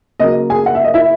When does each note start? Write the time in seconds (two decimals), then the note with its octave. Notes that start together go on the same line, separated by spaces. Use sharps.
0.20 C#3 F#3 A#3 D#5
0.50 G#4 G#5
0.66 F#5
0.75 E5
0.84 D#5
0.94 E4 E5